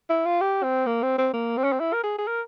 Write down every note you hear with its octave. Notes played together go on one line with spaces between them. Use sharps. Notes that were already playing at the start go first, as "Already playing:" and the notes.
E4
F4
G4
C4
A#3
C4
C4
A#3
C4
C#4
C4
E4
A#4
G#4
G#4
A#4